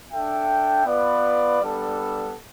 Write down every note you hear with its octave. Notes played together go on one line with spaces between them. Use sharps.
D4 A4 E5 G5
B3 F4 B4 D5
G3 B3 D4 A4